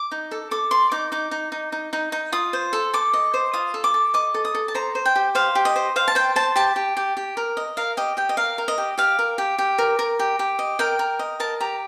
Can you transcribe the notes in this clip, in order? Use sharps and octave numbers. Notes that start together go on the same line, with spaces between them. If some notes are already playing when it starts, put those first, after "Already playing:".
Already playing: D6
D#4
A4
A4 D6
D5 C6
D#4 D6
D#4 D6
D#4
D#4
D#4
D#4
D#4
F4 D#6
C5
A4
A4 D6
D#5
C5
F4 D#6
A4
D6
A4
D#5 D6
A4
D#6
A4
A5
C5 A#5
C5
G5
G4
C5 F5
G4
D#5
C5
C5 F5
A5
C5 G5
C5 A5
G4 A5
G4
G4
G4
A#4
D#5
A#4 F5
G4 D#5
G4 G5
D#5
A#4 F5
A#4
D#5
G4
G4 F5
A#4
G4
G4
A#4
A#4
G4
G4
D#5
A#4 G5
A#4
D#5
A#4 A5
G4 A#5